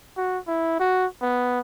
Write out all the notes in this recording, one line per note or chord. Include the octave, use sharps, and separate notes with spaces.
F#4
E4
F#4
B3